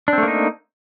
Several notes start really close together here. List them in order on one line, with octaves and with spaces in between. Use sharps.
D4 C4 A3 A#3 D#4